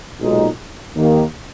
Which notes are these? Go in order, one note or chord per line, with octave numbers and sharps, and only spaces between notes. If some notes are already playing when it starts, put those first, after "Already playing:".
B1 A#2 G#3 D#4
D#2 D#3 A#3